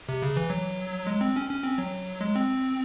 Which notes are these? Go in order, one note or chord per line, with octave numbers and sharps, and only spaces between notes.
C3
C#3
E3
F#3
G#3
C4
C#4
C#4
C4
F#3
G#3
C4